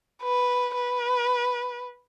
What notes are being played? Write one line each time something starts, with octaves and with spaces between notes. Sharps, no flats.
B4
B4